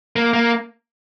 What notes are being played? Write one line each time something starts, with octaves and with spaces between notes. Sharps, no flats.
A#3
A#3